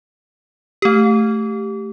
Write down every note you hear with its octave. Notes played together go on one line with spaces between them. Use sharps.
A3 G4